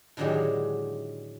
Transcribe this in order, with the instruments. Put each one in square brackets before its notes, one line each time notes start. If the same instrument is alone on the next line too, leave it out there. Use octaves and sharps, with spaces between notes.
[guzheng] A2 D3 D#3 F#3 G#3 G4